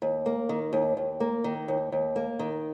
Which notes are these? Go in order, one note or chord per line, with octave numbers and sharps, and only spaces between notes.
D#2
A#3
D#3
D#2
D#2
A#3
D#3
D#2
D#2
A#3
D#3